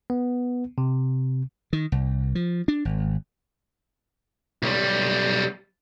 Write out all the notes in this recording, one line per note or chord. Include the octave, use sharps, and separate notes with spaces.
B3
C3
D#3
C2
F3
D4
G#1
B1 G3